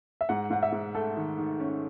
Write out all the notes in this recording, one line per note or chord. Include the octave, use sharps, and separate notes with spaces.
E5
G#2 F#5
G#2 F#5
E5
G#2
A3 A4
D#3
D#3
C#4